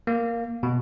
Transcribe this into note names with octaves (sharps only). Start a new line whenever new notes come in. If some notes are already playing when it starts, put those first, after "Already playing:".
A#3
B2